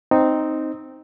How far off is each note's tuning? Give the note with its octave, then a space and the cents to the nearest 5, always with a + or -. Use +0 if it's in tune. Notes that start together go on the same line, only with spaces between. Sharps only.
C4 +0 D#4 +0